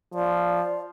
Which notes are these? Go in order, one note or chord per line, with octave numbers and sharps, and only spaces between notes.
F3 D5